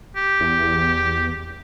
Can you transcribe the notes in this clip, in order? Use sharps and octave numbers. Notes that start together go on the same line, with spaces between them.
G4
E2